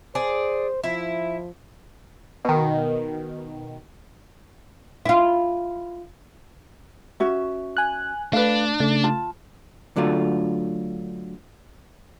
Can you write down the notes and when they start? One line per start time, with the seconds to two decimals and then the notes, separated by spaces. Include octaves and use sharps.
0.15 G#4 C5 D5
0.84 F3 E4
2.45 B2 D#3
5.05 E4 F4
7.20 C#4 F#4 E5
7.77 G#5 F#6
8.33 A3 D4 B4 F5
8.80 C#3 A3 D5
9.04 F4 A5
9.96 D3 F#3 A3 F4